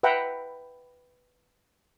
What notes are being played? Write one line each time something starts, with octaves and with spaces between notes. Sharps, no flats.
B4 E5 F#5 G5 A#5